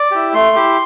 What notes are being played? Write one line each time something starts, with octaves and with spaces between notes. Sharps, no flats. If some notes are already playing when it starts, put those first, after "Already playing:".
Already playing: D5
E4 G4
A3 C6
E4 G4